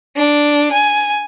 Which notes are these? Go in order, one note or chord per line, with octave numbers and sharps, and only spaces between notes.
D4
G#5